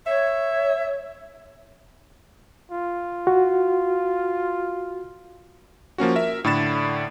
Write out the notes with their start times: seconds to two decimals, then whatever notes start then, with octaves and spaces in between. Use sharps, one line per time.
0.06 C#5 E5
2.71 F4
3.27 F#4
5.98 F3 A#3 C#4 F#4
6.15 A#4 E5
6.44 A2 D3 D5 B5 A6 E7